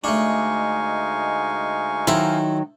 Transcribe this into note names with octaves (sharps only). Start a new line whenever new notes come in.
D2 G#3 A3 D4 D#4 F5 G#5 C#6
D#3 F#3 E4 A4 C5